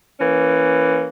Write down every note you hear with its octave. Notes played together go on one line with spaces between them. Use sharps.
E3 A#3 C#4